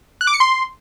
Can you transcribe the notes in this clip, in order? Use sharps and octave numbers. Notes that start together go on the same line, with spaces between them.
F#6
D6
C#7
C6